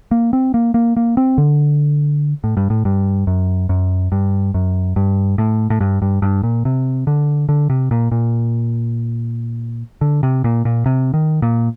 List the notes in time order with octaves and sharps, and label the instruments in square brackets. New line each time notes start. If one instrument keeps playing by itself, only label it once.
[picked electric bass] A#3
C4
A#3
A#3
A#3
C4
D3
A2
G2
A2
G2
F#2
F#2
G2
F#2
G2
A2
A2
G2
G2
G2
A#2
C3
D3
D3
C3
A#2
A#2
D3
C3
A#2
A#2
C3
D#3
A#2